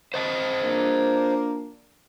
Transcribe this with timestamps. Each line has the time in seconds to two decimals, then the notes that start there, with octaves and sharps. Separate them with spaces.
0.14 C5 D#5 A5
0.64 F3 A#3 D4